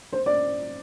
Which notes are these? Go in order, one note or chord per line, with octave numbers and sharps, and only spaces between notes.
C5
D5